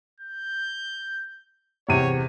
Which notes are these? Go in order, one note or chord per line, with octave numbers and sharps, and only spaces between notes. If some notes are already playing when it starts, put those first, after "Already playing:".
G6
E2 C3 C#5 D#7